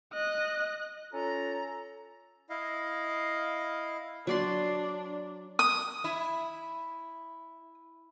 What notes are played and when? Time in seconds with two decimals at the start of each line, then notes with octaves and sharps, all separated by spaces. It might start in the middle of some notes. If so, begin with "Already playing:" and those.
0.14 D#5 F#6
1.13 C#4 F4 A4 A#5
2.50 E4 D#5 F5
4.27 F#3 D4 D5 C6
5.59 D#6
6.04 E4